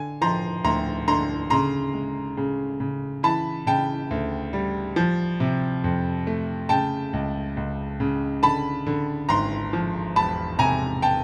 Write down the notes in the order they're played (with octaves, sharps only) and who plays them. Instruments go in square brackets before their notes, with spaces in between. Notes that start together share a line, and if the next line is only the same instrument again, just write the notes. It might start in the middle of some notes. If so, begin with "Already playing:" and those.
Already playing: [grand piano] D3 G#5
F3 A#5 C6
D2 A#5 C6
D3 A#5 C6
C#3 A#5 C6
G#3
C#3
C#3
E3 A5 B5
C#3 G5 A5
D2
G3
F3
C3
F2
A3
C#3 G5 A5
C#2
C#2
C#3
D3 A5 B5
D3
G#1 A#5 C6
F3
E1 A5 B5
C3 G#5 A#5
G5 A5